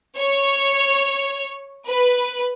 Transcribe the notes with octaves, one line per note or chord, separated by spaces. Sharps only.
C#5
B4